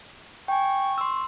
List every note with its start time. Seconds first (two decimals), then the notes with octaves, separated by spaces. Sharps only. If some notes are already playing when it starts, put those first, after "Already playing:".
0.48 G5 G#5 C#6
0.98 C6 E6